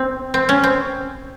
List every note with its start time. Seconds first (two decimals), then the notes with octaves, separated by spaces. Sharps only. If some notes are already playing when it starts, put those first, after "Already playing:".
Already playing: C4
0.34 C4
0.49 C#4
0.64 C4